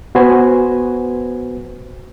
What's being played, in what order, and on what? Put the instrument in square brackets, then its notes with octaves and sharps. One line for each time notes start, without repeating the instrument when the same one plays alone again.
[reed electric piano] B3 F#4 B4 C5 G#5